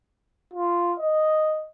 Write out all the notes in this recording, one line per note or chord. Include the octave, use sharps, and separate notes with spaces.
F4
D#5